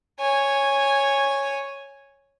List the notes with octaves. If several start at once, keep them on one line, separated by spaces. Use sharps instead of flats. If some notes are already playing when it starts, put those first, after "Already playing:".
C#5 G#5